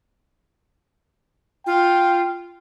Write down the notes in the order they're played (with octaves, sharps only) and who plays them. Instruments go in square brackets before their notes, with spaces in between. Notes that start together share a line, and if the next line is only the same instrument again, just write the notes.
[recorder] F4 [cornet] G5